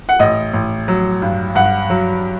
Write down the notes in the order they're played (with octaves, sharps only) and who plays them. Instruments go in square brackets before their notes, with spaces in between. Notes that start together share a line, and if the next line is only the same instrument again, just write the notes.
[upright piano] F#5
[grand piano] A1 [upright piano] D#5
[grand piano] A1
F#3
G2
[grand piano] G2 [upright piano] F#5
[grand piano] F#3